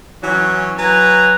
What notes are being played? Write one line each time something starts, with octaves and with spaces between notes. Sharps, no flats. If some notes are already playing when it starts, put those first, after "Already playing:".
E3 F#3 C#4
F#3 B4 G#5 A#5